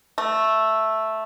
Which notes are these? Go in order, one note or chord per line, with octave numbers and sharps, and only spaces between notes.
A3